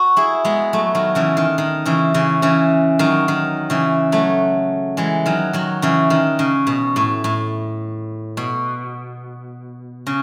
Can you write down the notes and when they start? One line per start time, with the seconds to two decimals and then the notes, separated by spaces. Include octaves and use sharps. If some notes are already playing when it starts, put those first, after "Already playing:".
Already playing: F#4
0.17 E4 G#4
0.45 G#3 B3
0.73 F#3 A3
0.95 D#3 F#3
1.15 C#3 E3
1.37 D#3
1.58 D#3
1.86 C#3 E3
2.14 C#3 E3
2.42 C#3 E3
2.99 D#3 F#3
3.28 D#3
3.70 C#3 E3
4.12 F#3 A3
4.97 E3 G#3
5.26 D#3 F#3
5.53 D#3 F#3
5.82 C#3 E3
6.10 D#3
6.39 C#3
6.67 B2
6.96 A2
7.24 A2
8.37 B2
10.07 C#3